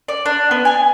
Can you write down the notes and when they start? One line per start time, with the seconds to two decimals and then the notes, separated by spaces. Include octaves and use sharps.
0.08 D5
0.26 D4
0.51 B3
0.65 G#5